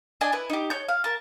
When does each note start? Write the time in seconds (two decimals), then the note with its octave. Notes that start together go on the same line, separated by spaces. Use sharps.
0.21 D4 D#5 G#5
0.32 E4 B4
0.50 D#4 G4
0.70 C#5 G6
0.89 F5
1.04 A#4 A5